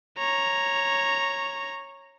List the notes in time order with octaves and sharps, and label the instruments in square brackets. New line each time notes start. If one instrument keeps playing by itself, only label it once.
[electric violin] C#5 A#5